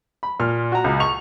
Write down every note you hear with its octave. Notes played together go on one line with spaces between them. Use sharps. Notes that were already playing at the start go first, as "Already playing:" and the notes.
B5
A#2 F6
F#4 A#5
C#2
C#6 F7